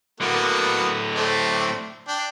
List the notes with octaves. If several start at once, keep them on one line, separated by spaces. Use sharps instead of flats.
A2 D3 A#3 B3 F#4
A3 C4 D4
D4 G5